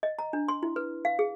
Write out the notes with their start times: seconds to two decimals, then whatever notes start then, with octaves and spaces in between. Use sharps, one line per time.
0.03 D#5
0.19 A#5
0.33 D4
0.48 C6
0.63 E4
0.76 B4
1.05 F5
1.19 G#4